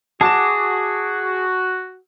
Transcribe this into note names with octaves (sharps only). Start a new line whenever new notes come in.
F#4 G#4 A5 D6 E7